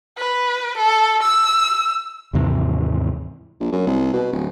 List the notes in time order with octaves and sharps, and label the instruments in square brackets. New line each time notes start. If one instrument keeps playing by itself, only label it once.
[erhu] B4
A4
E6
[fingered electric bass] D#2 G#2 C3 E3
[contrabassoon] A#1
F#2
C2
B2
D1